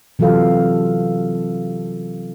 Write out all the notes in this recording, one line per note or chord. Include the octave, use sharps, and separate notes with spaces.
C3 E3 F#3 F4 A4 F5